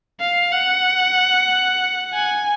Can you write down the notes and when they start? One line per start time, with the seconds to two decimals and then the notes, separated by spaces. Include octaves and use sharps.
0.20 F5
0.52 F#5
2.14 G#5